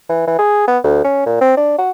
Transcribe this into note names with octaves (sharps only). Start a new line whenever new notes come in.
E3
E3
G#4
B3
D2
C#4
A#2
C4
D4
F#4